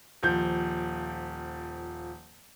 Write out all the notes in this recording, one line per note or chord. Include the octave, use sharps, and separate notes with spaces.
D#1 F3 G6